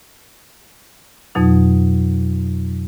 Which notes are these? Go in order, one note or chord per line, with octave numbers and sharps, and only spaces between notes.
F2 B2 F#3 D#4